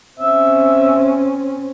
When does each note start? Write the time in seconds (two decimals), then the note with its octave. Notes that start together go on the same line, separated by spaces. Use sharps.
0.19 C4 C#4 E5